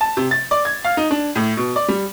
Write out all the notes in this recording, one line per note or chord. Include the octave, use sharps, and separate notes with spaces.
A5
C3
A6
D5
G#6
F5
D#4
D4
A2
B2
D5
G3